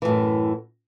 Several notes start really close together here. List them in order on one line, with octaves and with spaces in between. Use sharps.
E3 A2 F#2